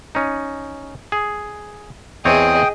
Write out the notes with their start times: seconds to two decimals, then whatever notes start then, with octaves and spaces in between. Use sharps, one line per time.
0.15 C#4 D#4
1.12 G#4
2.25 E2 C4 G#4 C#5 D#5 G5 D#6